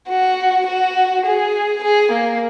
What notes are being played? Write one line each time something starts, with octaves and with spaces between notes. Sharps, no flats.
F#4
F#4
G#4
G#4
A#3